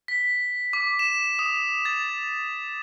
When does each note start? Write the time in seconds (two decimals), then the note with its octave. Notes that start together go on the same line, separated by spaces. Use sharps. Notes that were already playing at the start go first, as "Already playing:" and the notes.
0.08 B6
0.73 D6
0.99 E7
1.39 D#6
1.85 A6